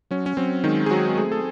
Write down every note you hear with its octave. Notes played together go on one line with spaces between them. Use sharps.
F#3 C#4
C#4
F#3 C4
D#3 G#3 D#4
G#4
F#3 C4 F#4
A3 G#4
A4